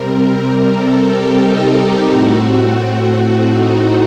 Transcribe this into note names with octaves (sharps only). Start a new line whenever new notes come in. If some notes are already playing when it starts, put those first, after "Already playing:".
Already playing: C3 G3 C4 A#4
A4
G4
D#4
A2 A3 C4 F#4
D#4